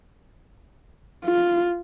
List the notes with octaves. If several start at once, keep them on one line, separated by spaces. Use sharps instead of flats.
F4